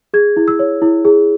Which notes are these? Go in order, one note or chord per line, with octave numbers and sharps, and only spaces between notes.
G#4 G#6
E4
E6
C#5
E4
G#4